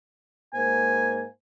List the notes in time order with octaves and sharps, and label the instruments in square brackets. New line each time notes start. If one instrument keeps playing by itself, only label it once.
[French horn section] G#2 A#3 C5 [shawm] G#5